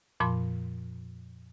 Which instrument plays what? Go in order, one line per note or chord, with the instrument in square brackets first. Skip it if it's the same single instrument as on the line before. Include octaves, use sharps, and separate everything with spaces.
[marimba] F2 A#2 F3 B5 C6